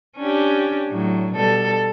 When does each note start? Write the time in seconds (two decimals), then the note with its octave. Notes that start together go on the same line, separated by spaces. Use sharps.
0.17 C#4 D4 G4
0.88 A2 F#3
1.33 B2 G3 A4